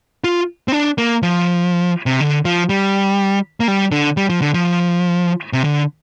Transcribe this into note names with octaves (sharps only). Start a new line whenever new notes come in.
F4
C4
D4
A#3
F3
C3
D3
F3
G3
A#3
G3
D3
G3
F3
D3
F3
C3
D3